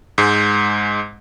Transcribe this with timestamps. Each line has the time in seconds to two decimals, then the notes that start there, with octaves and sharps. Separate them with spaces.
0.18 G#2 G#3